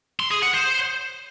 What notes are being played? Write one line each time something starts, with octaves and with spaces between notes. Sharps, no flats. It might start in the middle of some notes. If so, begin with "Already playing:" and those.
C6
G#4
F#5
C5